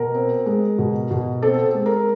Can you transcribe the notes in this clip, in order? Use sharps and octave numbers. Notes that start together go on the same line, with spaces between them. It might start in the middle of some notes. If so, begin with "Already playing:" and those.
Already playing: B2 A#4
C4
G#3
B2
B2
C4 A4
G#3
A#4